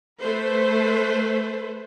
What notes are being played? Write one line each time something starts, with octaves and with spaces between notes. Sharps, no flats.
A3 B4 C5